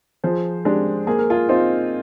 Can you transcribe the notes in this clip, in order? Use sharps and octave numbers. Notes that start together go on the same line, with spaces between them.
F3 G#4 C5
G#3 D4 G4
A#3 G#4
A#4
F4 G#4
C4 D#4 F4 C5